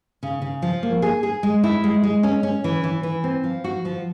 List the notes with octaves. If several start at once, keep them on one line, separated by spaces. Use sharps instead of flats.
C#3
C#3
F3
A#3
G#4
G#4
G#3
E4
G#3
G#3
C#4
C#4
E3
E3
E3
C4
F3
F#4
F3